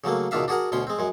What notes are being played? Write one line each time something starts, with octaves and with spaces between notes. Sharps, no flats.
C#3 F#3 A3 A#3
C#2 B2 D#3 D4 E5 F5
D4 F#4 G#4 A#4 F#5
D2 B2 C#4 C6
G#3 C4
F#2 G#3